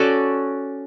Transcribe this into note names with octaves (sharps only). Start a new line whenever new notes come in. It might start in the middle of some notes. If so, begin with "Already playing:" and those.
Already playing: C#4 F#4 A4 D5